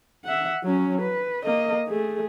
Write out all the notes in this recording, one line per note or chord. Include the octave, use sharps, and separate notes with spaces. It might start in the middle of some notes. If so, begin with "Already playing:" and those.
E5 F#5
F#3 C#4
B4
A#3 D#5
A3 G#4